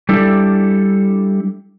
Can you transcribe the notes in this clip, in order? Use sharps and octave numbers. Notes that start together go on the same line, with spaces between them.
G3 D4 E4 A4